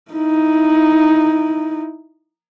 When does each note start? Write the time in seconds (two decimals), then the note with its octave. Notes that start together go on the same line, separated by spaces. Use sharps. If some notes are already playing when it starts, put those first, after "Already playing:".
0.11 D#4 E4